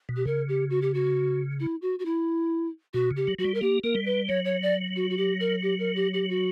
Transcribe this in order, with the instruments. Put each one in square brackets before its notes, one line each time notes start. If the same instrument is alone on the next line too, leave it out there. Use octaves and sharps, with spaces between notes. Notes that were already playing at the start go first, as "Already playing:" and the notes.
[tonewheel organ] B2
[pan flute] G4
[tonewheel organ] C#3 [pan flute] A#4
[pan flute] G4
F#4
G4
F#4
E4
F#4
F#4
E4
[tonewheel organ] B2 [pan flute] F#4
[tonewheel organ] C#3
[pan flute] G4
[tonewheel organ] F#3
[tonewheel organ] F#3 [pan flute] F#4
[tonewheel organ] G3
[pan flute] A#4
[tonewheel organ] A#3 [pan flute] G4
[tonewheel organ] A#3 [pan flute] A#4
[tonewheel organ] G3
[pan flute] B4
[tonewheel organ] F#3 [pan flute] C#5
[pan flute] C#5
D5
F#4
F#4
G4
A#4
G4
A#4
G4
G4
F#4